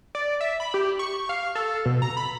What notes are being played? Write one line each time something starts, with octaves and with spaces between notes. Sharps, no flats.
D5
E5
B5
G4
C#6
F5
A4
B2
A#5
B5